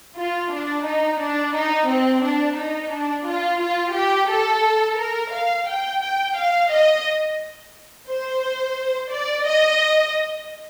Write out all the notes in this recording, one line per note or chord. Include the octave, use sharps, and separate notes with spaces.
F4
D4
D#4
D4
D#4
C4
D4
D#4
D4
F4
F4
G4
A4
A#4
F5
G5
G5
F5
D#5
C5
D5
D#5